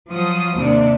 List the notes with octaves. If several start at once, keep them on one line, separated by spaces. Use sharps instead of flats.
F3 F#3 D#6
D#2 C3 D4